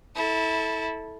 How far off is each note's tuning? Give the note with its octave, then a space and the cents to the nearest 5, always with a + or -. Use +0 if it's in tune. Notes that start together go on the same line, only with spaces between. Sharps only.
E4 -20 A4 +0